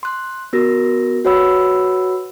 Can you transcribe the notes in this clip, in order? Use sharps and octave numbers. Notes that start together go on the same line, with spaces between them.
C6 F#6
B3 F#4 A#4 A#6
F#4 B4 C#5 F#5 B5 E6